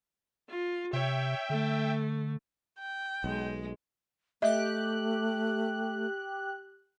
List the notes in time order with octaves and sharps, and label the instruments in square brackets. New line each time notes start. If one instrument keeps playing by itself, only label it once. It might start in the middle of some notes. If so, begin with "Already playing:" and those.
[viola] F4
[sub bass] C3 [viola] C#5 [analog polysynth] E5 G5
[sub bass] D3 [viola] A3
[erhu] G5
[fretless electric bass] B1 [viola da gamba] G#3
[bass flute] A3 [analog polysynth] G4 F#6 [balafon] D#5 E5